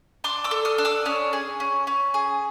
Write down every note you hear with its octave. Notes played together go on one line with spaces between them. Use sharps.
D4 C6 D6
D6 E6
A4
D#6 F6
D4
D6 E6
C#4 D#6 F6
G#4
C#4
C#4
G#4